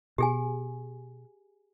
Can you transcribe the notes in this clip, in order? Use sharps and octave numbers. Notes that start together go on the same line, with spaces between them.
B2 G4 G#4 G#5